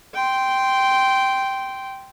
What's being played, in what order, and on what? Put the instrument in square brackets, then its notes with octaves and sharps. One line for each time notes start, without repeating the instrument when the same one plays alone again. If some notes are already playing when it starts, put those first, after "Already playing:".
[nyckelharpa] G5 C6